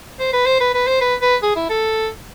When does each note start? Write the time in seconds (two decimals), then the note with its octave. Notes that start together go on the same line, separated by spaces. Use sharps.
0.19 C5
0.33 B4
0.46 C5
0.61 B4
0.74 B4
0.87 C5
1.01 B4
1.22 B4
1.43 G#4
1.56 E4
1.70 A4